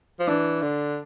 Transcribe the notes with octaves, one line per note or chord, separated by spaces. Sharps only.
F3
E3 D4
D3